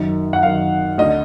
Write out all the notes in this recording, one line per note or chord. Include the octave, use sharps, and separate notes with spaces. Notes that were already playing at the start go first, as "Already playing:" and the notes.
Already playing: F#2 D#3
F#5
F#2 D#3 F5
D2 D3 D#5